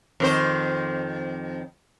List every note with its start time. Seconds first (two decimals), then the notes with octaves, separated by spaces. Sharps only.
0.20 F2 D#3 C5